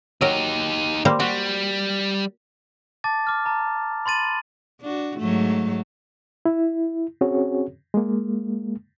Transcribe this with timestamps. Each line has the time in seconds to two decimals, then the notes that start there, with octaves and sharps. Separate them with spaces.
0.21 F#3 D#4 G4 A#4
1.05 G3 A#3 C5
1.20 G3 F#4
3.04 A5 D6 A6
3.27 D6 F6
3.46 A5 A#5
4.06 B5 C6 A6 D#7 F#7
4.81 D4 F#4
5.18 G#2 F#3 A3
6.45 E4
7.21 C4 C#4 F#4 G#4 C#5
7.94 G#3 A#3